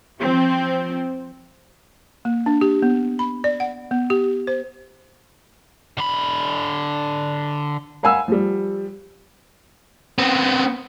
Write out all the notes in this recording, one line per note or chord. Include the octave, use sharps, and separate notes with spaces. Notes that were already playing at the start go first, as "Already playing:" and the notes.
F3 C4
A#3
D4
G4
B3
B5
D5
F#5
B3
G4
C5
D3 B5
A#4 F5 F#5 G#5 B5 E6
F3 G3
B3 C4